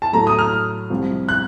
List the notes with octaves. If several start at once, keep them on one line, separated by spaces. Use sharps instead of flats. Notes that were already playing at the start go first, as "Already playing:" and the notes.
A5
A2 F#3 A3 A#5
D#6
F6
C2 C3 F3
F#6